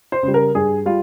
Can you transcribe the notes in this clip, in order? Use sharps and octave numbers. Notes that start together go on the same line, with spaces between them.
C5
C#3 G3
A#4
G2 G#4
G3 F4